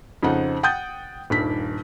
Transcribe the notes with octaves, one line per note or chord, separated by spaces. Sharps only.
F2 C#3 C4 D#4 F#5
F#5 G5 D#6 G6 A6
D#1 G2 D#3 B6